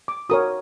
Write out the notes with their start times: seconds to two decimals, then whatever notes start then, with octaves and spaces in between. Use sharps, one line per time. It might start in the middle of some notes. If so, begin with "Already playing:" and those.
0.08 D6
0.29 F#4 A#4 C#5 D#6